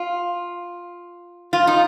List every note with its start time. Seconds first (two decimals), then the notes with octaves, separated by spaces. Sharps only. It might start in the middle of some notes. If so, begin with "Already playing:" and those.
Already playing: F4
1.53 F4
1.67 D#4